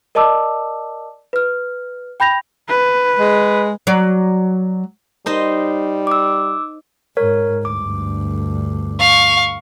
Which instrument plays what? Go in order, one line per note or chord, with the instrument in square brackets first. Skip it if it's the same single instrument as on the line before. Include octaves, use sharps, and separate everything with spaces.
[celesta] A#4 D5 D#5 A5 D6 E6
B4 F6
G5 B5 G6 A#6 F7
[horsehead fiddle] B4
[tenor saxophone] G#3
[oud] F#3 D5
[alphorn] G3 [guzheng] D#4 C5 D#5
[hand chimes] D6 E6
[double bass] G#2 [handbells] A#4 C#5
[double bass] D2 G2 [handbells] D6
[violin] F5 C#6